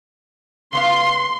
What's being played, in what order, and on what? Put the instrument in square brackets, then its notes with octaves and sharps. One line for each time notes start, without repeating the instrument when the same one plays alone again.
[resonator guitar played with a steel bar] C#3 B3 F5 [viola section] C6